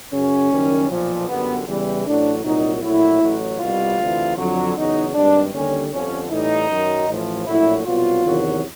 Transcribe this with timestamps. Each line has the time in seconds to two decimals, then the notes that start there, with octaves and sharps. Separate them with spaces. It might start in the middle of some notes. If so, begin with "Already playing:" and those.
0.12 F#2 C#3 F#3 C#4
0.50 F#1 F#2 D#3 G3
0.89 B1 A#2 F3
1.28 G1 F#2 D3 G3 B3
1.67 E2 C#3 E3 G3
2.05 A1 A2 F#3 D4
2.44 C2 A#2 F#3 D#4
2.82 A#1 A2 F#3 E4
3.21 A1 A2 F#3
3.59 C2 B2 G3 F4
3.98 D2 C3 E3
4.37 F2 D3 F#3
4.76 E2 C#3 F#3 D#4
5.14 G#1 G2 D#3 G3 D4
5.53 D#2 D3 G3 C#4
5.92 G1 F2 D3 F3 C#4
6.30 A1 A2 E3 G3 D#4
6.69 F#2 D#3 F#3
7.08 A1 A2 F3
7.46 A#1 A2 F#3 E4
7.85 C2 B2 F#3 F4
8.24 E2 C3 D#3 F#3